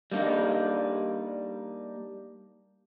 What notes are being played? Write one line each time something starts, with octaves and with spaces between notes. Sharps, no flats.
G3 A#3 D4 D#4